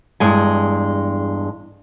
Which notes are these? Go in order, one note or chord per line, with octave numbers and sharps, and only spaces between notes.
E2 G2 G#3 G#5